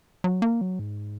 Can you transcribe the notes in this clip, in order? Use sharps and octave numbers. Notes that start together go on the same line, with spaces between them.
F#3
A#3
F#3
G#2